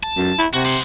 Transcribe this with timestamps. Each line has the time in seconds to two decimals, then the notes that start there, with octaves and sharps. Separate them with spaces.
0.03 A5
0.17 F#2
0.38 E4
0.53 C3 F#4
0.65 C5 F#5